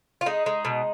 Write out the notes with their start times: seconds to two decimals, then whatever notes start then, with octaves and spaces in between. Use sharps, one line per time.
0.21 F4
0.26 G#3 D#4
0.46 G#3
0.65 B2